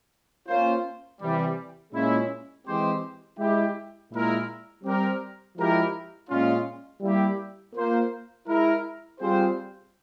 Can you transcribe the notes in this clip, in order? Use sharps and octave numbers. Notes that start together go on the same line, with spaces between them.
A#3 C#4 F4 C5
C3 E3 G3
A#2 G#3 C#4 E4
E3 G#3 C4 G4 C5
G#3 E4 G4
A#2 G#3 E4 A#4
G3 C4 G4 A#4
F3 G#3 E4 G4 A#4
A#2 G#3 C#4 F4
G3 A#3 E4 G4
A#3 F4 C5
G#3 E4 A#4
G3 C4 F4 G#4 C5